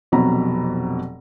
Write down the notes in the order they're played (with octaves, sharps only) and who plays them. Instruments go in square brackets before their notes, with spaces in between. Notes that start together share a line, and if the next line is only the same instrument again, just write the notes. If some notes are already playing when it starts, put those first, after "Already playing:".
[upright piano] F1 F2 B2 F#3 A#5 B5